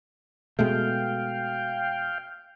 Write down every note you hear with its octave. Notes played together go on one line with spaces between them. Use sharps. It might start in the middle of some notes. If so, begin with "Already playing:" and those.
B2 G#3 A3 F5 G5